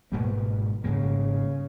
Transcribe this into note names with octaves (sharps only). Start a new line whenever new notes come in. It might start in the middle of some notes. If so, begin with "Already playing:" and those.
G#1 G#2 B2 G3 A#3
G#1 G#2 C#3 G3 A#3